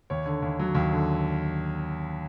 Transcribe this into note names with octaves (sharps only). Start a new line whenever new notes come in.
D#2 C#5
D3
D#2
F#3
D#2
D3